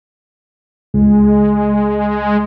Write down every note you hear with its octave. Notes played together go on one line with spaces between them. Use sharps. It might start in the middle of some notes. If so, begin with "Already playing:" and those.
C#2 G#3